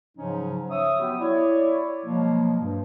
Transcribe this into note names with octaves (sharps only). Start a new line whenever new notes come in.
G#2 C#3 F3 F#3 C#4 D#4
C#5 E5 D#6
F#3 B3 F#4 G4
E4 C#5 D5
B2 F3 F#3 G#3 A#3
G2